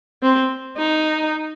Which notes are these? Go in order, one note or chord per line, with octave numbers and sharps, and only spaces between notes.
C4
D#4